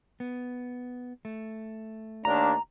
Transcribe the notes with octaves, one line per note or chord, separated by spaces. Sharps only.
B3
A3
D#2 A#3 D4 A#5